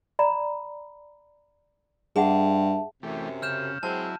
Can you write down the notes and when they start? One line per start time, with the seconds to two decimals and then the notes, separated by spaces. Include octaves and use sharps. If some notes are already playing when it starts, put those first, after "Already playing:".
0.19 D5 A#5 B5
2.16 G2 G#4 E5 F#5 A5
3.03 F#2 C3 E3 A3 G4
3.42 C#3 F6 G6 E7
3.83 F#3 G#3 C4 E4 A5